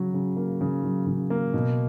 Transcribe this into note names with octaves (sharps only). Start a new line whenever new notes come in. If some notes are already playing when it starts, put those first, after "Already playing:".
Already playing: C#3 F#3
C#3
A#3
C#3
F#3
C#3
A#3
B2